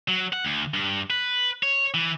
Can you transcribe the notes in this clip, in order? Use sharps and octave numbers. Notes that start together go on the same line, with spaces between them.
F#3
F#5
D2
G2
B4
C#5
E3